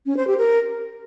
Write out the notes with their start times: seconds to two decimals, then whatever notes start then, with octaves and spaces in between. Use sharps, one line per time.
0.06 C#4
0.17 C5
0.27 G4
0.38 A#4